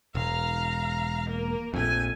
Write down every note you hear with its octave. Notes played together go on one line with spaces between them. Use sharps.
E1 F5 A#5
A#3 A#4
A#1 F2 A3 G#5